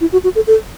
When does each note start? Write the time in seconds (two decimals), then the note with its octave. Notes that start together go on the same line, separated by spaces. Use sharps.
0.01 E4
0.12 F#4
0.24 F#4
0.35 A4
0.47 A4